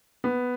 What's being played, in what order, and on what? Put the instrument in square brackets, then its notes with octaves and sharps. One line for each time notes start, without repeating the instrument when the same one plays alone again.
[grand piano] B3